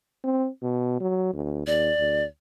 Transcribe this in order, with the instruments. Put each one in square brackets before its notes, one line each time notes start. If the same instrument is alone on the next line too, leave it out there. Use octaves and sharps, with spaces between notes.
[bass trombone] C4
B2
F#3
D2
[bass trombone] D#2 [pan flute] D5
[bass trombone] D2